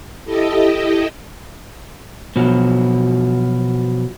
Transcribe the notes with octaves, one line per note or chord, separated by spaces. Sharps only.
E4 G4 A4 D#5
B2 F3 F#3